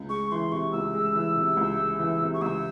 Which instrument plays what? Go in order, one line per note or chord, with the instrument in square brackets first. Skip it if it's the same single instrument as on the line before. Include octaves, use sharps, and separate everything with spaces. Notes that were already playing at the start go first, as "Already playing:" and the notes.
Already playing: [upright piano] C#2
[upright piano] G#3 [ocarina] C#6
[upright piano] E3 [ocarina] C6
[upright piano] C3 [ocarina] C#6
[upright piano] C#2 [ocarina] E6
[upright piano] G#3
E3
C3
C#2
G#3
E3
C3
[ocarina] C#6
[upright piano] C#2 [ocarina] E6